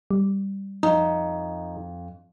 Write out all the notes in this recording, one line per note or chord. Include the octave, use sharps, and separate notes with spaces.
G3
F2 D#4